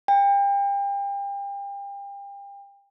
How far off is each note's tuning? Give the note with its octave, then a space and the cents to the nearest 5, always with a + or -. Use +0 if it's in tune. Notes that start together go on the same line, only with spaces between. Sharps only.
G5 +35